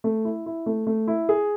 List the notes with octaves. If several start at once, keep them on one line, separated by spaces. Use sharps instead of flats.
A3
E4
E4
A3
A3
E4
G#4